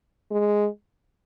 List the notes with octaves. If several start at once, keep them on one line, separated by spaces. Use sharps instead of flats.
G#3